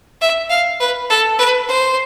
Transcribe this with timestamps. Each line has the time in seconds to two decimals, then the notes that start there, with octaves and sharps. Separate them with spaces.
0.21 E5
0.50 F5
0.80 B4
1.10 A4
1.39 B4
1.69 C5